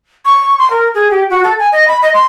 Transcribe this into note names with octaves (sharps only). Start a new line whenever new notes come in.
C#6
C6
A#4
G#4
G4
F#4
A4
G#5
D#5
B5
D#5
C6